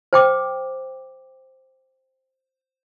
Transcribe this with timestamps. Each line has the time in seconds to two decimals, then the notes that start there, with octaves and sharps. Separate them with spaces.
0.13 C5 G5 D6